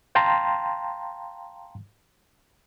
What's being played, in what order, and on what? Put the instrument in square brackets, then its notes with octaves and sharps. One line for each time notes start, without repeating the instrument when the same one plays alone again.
[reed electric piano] F5 G5 A5 A#5 C6